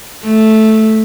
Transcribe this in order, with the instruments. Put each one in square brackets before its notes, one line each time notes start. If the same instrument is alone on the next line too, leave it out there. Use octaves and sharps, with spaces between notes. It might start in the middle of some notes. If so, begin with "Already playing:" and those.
[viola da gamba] A3